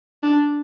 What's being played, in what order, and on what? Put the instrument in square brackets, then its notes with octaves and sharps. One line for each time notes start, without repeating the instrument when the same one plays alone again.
[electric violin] D4